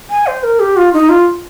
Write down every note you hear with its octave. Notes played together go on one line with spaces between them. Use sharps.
G#5
C5
A#4
G4
F4
D#4
F4